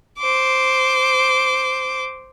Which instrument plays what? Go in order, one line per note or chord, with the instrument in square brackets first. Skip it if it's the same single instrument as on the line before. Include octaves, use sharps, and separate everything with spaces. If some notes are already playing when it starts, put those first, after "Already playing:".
[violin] C5 D6